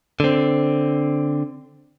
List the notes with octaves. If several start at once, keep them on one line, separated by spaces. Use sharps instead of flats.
D3 C4